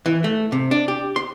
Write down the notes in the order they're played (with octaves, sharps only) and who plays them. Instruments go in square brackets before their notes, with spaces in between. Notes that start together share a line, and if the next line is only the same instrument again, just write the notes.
[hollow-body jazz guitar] E3
A3
C3
D4
G4
C6